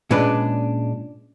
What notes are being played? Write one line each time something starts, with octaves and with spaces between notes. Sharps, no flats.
A#2 G#3 C#4 D4 B4 D5